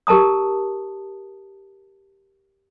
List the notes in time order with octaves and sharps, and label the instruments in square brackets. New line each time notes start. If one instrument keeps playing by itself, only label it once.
[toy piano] G4 A#4 A5 A#5 D#6